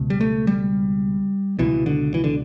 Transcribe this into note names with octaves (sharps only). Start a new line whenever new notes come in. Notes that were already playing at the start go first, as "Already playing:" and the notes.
Already playing: C#2 B2
G3
A3
G3
C#2 B2 E3
D3
E3
D3